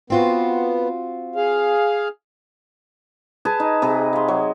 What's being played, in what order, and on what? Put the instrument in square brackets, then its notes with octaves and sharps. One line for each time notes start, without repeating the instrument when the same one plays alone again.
[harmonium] B3 [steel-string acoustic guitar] C4 F4 F#4
[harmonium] G#4 F5
[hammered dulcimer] G#4 B4 G#5 A5
D#4
C3 G#4 B4
F5 C6
F#3